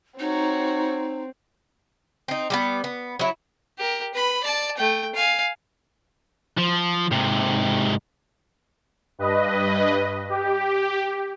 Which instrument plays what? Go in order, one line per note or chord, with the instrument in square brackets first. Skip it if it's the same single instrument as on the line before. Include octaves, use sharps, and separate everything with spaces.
[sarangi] C4 [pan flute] D#4 [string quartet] F#4 C#5
[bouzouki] C4 D#4
G3 A#3 B3
B3
F#3 E4
[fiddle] G4 A#4
B4 B5
D5 A5
A3 G5
F5 G#5
[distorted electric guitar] F3
G#2 C3
[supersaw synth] G2 B4 D#5
G4